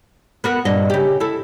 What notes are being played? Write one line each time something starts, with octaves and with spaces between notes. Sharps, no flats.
B3 F#4 A#4
G2 A#2 D#5
C#3 G4
E4 A4